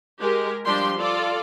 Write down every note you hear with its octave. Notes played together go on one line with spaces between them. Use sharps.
G#3 G4 A#4
F3 G3 D4 G4 G5 C6
F4 A4 D5